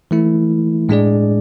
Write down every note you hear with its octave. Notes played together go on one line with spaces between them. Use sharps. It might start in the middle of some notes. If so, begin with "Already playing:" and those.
E3 A3 E4
A2 G#3 D4 G#4 D5